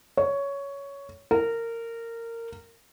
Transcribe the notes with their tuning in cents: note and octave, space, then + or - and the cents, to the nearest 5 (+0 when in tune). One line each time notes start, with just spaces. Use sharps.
C#5 +10
A#4 -20